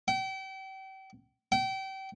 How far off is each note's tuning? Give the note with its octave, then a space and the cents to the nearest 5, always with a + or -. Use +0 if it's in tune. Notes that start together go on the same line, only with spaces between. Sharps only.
G5 -35
G5 -30